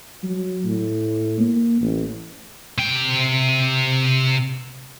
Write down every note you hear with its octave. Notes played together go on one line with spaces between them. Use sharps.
F#3
A2
A#3
A1
C3 G5